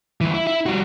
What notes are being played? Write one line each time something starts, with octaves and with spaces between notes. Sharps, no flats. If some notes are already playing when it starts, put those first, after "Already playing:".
D2 E3
E4
E4
G3 F#4